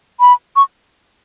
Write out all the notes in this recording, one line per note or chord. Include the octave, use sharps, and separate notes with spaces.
B5
C#6